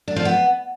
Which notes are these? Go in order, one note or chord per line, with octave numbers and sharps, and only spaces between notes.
D4
F3
B3